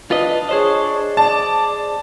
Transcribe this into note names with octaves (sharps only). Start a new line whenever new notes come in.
D4 F4 B4 D#5
G#4 C5 C#5 D#5
D5 A5